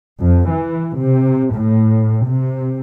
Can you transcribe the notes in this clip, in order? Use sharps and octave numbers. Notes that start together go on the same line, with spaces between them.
F2
E3
C3
A2
C3